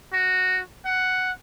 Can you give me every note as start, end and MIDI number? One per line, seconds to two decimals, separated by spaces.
0.13 0.62 66
0.86 1.32 78